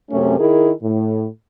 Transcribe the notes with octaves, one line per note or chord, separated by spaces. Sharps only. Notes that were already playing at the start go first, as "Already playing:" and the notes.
F#2 C3 A3 C#4
D#3 E4 G#4 A#4
A2